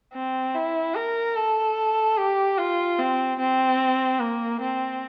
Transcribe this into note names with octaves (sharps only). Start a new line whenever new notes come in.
C4
E4
A#4
A4
G4
F4
C4
C4
A#3
C4